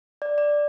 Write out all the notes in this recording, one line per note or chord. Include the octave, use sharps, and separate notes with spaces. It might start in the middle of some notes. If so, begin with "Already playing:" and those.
D5
D5